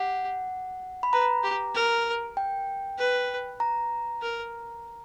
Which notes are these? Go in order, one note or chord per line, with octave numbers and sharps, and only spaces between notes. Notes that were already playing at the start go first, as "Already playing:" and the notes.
Already playing: G4 F#5
B5
B4 A#5
G4
A#4
G5
B4
A#5
A#4